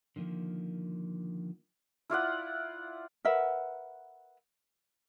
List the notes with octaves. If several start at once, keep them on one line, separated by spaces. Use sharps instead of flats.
D3 D#3 F3 A#3
E4 F4 D5 F#5
A#4 B4 E5 F#5